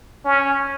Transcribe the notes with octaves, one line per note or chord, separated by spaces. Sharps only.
C#4